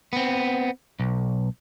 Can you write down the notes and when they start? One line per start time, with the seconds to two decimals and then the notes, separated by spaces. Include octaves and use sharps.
0.13 B3 C4
1.00 B1